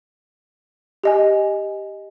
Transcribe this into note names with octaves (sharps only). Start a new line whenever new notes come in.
G4 D#5 G#5